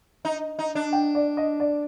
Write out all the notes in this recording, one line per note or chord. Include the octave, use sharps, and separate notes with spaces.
D#4
D#4
D4
G5
D5
D#5
D5